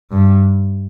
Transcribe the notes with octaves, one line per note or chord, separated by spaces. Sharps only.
G2